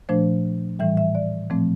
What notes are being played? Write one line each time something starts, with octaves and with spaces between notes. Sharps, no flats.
A#2 F3 A3 D4 C5
A2 E3 G3 E5
E5
D5
A#2 F3 A3 C4